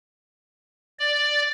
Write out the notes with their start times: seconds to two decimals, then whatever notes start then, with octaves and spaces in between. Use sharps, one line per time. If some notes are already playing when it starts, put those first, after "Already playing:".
0.99 D5